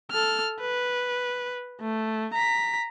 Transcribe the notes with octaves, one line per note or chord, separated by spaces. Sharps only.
A4 F6
B4
A3
A#5 B6